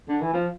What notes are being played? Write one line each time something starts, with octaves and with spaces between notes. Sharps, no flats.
D3
E3
F3